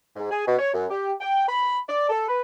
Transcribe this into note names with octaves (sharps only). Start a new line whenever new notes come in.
G#2
G#4
B2
C#5
F#2
G4
G5
B5
D5
A4
B4